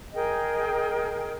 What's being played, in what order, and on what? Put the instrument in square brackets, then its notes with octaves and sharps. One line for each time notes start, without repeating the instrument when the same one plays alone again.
[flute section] G#4 A#4 D#5 G5